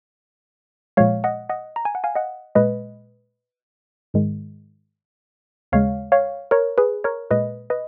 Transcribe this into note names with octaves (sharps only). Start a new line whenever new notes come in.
A#2 F3 G#3 C#5 F5
D#5 F#5
D#5 F#5
A#5
G#5
F#5
F5 G#5
D#5 F#5
A#2 G#3 B4 D#5
G#2 D#3 G#3
D#2 C#3 G#3 C#5 F5
C#5 F5
A#4 C#5
G#4 B4
A#4 C#5
A#2 G#3 B4 D#5
B4 D#5